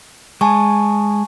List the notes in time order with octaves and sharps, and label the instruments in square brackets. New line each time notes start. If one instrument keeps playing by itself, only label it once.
[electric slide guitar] G#3 [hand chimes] G#5 A5 C#6